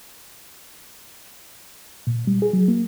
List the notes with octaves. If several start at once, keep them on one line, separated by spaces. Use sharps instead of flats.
A#2
G3
G#4
F#3
A#3